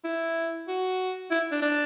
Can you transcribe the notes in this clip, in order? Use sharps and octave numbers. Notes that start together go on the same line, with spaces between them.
E4
F#4
E4
D4
D4